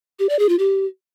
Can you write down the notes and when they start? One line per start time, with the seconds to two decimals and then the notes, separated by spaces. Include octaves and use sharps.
0.19 G4
0.29 D5
0.39 G#4
0.49 F4
0.59 G4